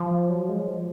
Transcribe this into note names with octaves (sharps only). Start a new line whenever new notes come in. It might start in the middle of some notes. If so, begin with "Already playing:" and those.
Already playing: F3
F#3
G#3
F3